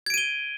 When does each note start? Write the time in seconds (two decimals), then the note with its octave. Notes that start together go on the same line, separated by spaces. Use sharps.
0.06 G#6
0.10 D7
0.14 D#7
0.18 G7